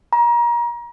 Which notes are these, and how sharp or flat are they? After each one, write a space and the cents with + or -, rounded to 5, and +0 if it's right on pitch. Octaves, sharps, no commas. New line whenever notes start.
A#5 +30